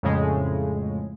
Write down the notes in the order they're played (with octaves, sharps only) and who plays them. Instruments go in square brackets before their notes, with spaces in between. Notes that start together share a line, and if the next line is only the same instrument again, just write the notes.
[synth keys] F2 A2 C#3 G#3